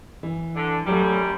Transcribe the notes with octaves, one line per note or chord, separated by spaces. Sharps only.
E3
D3
F#2 F#3 G3 A3